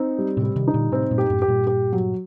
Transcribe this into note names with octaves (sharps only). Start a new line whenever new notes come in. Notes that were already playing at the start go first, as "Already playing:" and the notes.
Already playing: C4 D#4
G3
A2 C3
G3
C3 D#3
D#4
A#2 D3
A2 C3 C4
G2 A#2
G4
F#2 A2
G4
G2 A#2
G4
F#3